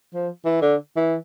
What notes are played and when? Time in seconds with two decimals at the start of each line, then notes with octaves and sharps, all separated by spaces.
0.14 F3
0.45 E3
0.62 D3
0.96 E3